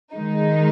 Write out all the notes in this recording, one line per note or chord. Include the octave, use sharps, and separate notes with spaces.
D#3 G#3 D#4